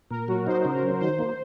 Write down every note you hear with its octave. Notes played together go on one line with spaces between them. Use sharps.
A#2 A#4
F#3 F#4
D#4 C5
C#3
A#4
F#3
D#3 C5
A#3